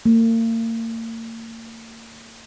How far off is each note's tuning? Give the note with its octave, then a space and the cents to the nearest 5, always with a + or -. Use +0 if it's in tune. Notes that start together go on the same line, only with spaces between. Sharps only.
A#3 -40